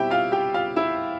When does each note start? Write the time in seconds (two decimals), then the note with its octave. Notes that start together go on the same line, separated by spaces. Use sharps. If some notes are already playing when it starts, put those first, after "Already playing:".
Already playing: B2 G3 C4 E4 G4 E5 G5
0.10 F4 F5
0.32 G4 G5
0.54 F4 F5
0.76 E4 E5